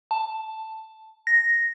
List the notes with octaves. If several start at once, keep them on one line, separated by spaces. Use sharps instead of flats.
A5
A#6